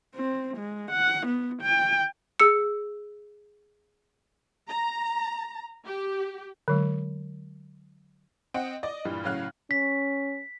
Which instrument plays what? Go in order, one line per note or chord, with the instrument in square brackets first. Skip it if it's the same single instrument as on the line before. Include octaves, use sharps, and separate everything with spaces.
[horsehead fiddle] C4
G#3
F#5
B3
G5
[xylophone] G#4 E6 C#7
[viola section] A#5
G4
[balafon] D3 F#3 G#3
[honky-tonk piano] C4 D#5 F#5
D5 D#5
G2 A#2 E3 G3
A2 C#3 F#3 F5 F6 F#6
[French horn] C#4 [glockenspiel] B6